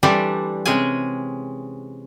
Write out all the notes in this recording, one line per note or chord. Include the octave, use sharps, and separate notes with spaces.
E3 G3 A3 D4 G4 C5
C3 G#3 C#4 G#4 G#5